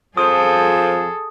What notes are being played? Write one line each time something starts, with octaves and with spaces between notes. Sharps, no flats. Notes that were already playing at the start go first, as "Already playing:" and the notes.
F2 F3 G#4 A4 D#6